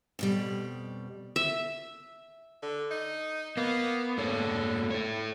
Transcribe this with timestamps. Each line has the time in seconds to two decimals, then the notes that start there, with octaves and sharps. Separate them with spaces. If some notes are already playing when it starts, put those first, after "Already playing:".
0.19 F2 B2 G3
1.36 E5
2.63 D3
2.91 D#4
3.57 A#3 B3
4.18 G#2 D3 A#3 C#5
4.90 A4 C#5